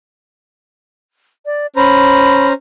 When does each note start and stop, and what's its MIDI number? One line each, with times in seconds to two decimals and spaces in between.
1.46 1.67 74
1.76 2.53 61
1.76 2.53 72
1.76 2.53 82
1.76 2.47 83